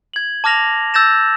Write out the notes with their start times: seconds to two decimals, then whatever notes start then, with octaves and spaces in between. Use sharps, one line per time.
0.14 G#6 F#7
0.44 A5 D6 F6 A#6 F7 F#7
0.94 E6 G6 A6 A#6 E7